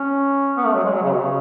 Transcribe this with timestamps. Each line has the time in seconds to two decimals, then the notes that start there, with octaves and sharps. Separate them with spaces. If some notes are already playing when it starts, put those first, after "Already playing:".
Already playing: C#4
0.57 B3
0.65 A3
0.76 F#3
0.84 G#3
0.94 F#3
1.03 C#3
1.13 B2
1.22 C#3